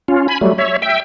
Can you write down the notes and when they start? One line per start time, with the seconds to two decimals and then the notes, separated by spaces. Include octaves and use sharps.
0.08 C#4 F4
0.28 G#5 B5
0.41 F#3 G3 A3
0.58 C#5 E5
0.82 E5 G5